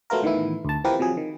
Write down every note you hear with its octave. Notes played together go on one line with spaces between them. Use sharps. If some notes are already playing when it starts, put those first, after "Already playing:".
F#3 A3 B3 F4 A#4
A2 D#3 E3 B3 E4
D2 A5
E3 C4 F4 G4 A#4 B4
C3 F3 F#3 G#4
D#3